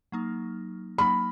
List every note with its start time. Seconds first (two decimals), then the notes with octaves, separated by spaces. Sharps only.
0.12 F#3 A#3 D#4
0.98 F#3 A#3 D#4 B5